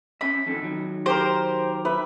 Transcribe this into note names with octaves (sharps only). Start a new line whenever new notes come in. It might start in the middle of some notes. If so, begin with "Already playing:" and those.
C#4 E5 B5
F2 D#3 A4
D#3 F#3
G4 A#4 C5
B4 E5